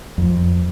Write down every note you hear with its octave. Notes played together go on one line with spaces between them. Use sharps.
F2